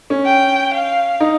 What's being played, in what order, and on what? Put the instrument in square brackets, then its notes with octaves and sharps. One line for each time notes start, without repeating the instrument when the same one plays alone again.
[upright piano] C#4
[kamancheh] G5
F5
[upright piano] D#4